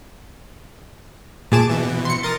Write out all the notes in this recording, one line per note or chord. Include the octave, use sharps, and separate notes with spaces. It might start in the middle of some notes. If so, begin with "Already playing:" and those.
A#2 G#4 A5 D6 E7
B2 E3
C6 C#7
A#4 C6 D#6 A6